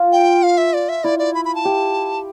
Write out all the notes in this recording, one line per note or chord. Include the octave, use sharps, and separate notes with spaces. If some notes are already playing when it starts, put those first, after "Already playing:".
Already playing: F4
G5
F5
E5
D5
E5
E4 D5
D5
B5
B5
A5
G4